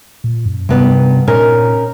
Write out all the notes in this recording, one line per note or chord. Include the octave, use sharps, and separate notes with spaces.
A#2
F#2
G2 C3 B3 D#4
A#2 C#4 D#4 A#4